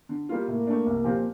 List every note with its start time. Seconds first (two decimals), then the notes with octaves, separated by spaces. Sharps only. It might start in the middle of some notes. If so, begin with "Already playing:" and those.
0.09 D3
0.29 G3 A#3 F4
0.48 A2 A#3
0.67 A3 D4
0.86 C2
1.04 A#2 F3 C4 G4